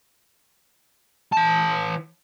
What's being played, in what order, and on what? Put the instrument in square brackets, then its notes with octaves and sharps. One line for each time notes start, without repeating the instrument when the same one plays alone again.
[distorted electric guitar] E3 A5